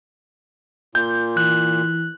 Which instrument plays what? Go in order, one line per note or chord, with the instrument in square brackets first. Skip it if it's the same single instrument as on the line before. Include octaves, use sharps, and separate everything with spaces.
[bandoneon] A#2 [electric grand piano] G6
[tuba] E3 [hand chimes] F#6